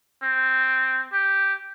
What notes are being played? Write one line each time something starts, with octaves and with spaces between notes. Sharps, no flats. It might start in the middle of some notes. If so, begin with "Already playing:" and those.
C4
G4